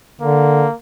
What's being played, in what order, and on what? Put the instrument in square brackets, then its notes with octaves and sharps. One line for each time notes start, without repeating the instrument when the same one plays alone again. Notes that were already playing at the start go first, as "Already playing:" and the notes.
[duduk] D3 [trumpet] A#3